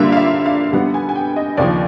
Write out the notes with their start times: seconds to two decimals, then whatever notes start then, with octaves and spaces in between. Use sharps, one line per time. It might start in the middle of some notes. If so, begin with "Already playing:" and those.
Already playing: D3 G3 A#3 D4 F4 E5
0.12 F5
0.17 E5
0.46 F5
0.73 D3 G3 B3 F#5
0.94 G#5
1.09 G#5
1.15 G5
1.36 D#5
1.57 D#2 C#3 F3 D5